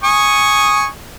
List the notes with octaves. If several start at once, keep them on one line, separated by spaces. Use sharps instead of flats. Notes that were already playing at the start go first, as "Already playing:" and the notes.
G#5 C#6 D#6